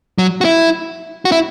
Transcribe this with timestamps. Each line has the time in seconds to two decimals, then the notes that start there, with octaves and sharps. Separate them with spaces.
0.18 F#3
0.41 F#4
0.45 E4
1.25 F#4
1.32 E4